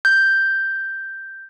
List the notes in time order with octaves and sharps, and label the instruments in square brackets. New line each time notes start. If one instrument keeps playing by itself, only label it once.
[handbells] G6